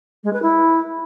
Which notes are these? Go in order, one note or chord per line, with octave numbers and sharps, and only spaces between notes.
G#3
B4
E4